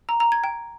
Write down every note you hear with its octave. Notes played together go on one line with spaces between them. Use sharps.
A#5
A#5
G#6
G5